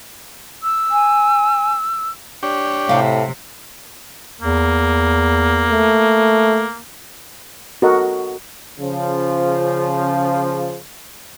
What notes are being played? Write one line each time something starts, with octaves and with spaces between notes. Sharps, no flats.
E6
G#5
D4 G4 C#5
A2 C3 A3 F5
E2 A#3
A3
F#4 A4 A#4 D#5 F#5
C#3 F3